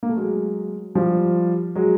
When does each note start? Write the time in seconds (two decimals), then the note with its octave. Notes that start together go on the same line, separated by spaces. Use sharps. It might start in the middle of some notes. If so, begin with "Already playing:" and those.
0.03 A#3
0.09 A3
0.16 F#3 G#3
0.95 F3 G3
1.75 F#3 G#3